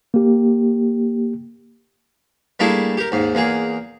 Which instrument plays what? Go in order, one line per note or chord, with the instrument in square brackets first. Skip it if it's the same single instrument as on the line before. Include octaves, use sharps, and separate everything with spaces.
[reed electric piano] A#3 G4
[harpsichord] G3 A3 A#3 D4 E4 G#4
G4 A#4
D#2 G#2
E2 A#3 G#4